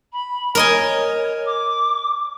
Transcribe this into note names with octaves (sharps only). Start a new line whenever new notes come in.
B5
A#4 C#5 D#5 G#5
D6